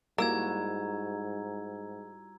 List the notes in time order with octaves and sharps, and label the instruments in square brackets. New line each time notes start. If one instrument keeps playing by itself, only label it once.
[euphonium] G#2 [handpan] G3 E4 F#4 [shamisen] A#3 [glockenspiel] A#5 E6 G#6